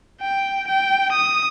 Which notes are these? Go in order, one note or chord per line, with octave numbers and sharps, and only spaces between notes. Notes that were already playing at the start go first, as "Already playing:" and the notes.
G5
G5
D#6